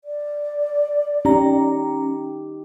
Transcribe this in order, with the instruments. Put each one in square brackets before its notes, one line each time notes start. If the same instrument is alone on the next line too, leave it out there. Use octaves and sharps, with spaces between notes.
[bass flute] D5
[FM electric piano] C#4 A#5 [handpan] D#4 G4